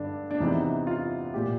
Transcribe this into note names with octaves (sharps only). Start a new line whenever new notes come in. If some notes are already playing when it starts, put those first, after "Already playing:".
Already playing: G2 D3 D4
D4
E2 C3 E3 D#4
F4
A#2 G4